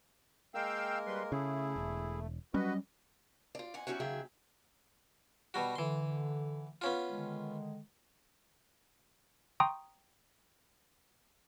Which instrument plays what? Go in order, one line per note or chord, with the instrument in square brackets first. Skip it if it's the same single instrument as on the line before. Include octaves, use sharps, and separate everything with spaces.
[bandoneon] G#3 A#3 A#4 [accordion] F5 G5 E6
[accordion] G3 B4 C6
[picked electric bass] C#3 [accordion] A3 [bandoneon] E4 G#4
[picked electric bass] E1
[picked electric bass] F#3 G3 C#4 [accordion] F#4 B4 [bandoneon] D#5
[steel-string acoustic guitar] F4 D5
F2 F#5 G#5
F#3 G3 C#4 E4 F#4
D#2 C#3 F#3 G#4 E5 G5
[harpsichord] B2 G3 F#4
[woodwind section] D3 [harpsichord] E3 C6
[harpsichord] B3 C#4 F4
[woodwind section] D3 D#3 G#3
[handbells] G5 A#5 C6 C#6 D#6